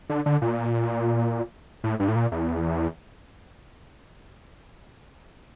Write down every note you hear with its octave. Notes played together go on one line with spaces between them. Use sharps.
D3
D3
A#2
A2
G2
A2
A#2
E2